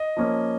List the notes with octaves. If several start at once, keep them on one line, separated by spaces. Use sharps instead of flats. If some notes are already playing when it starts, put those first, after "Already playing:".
Already playing: D#5
F3 A#3 C#4